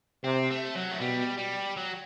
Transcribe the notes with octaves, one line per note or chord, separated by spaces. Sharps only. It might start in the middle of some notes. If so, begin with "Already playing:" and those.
C3 C4
A3
F#3
A3
B2 G3
G3
F#3